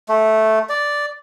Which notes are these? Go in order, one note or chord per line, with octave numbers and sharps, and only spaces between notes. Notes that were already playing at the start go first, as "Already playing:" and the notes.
A3
D5